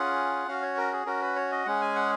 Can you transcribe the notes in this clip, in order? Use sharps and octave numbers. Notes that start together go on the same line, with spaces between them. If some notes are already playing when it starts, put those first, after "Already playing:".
Already playing: C#4 F4 G#4 F#5
C#4 F#4 F5
C#5
A#4
G#4
C#4 F#4 A#4
B4
C#5
D#5
G#3 C#4 G#4 F#5
G#5
F#5